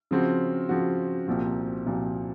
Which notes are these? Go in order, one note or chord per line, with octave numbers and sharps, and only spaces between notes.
C#3 F3 C4 F#4
C#3 F3 C4 F#4
C2 A#2 F3 C4 F#4
C2 A#2 F3 C4 F#4